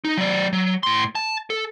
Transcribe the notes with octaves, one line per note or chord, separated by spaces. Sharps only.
D#4
F#3 D5
F#3
A2 C6
A5
A4